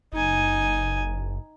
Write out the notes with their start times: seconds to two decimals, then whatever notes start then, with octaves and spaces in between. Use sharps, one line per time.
0.13 F#1 D#4 G#5